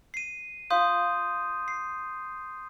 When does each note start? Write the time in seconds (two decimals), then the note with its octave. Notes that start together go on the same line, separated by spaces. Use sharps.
0.14 C7 D#7
0.70 F4 C#5 F5 C6 D#6 G6
1.68 C7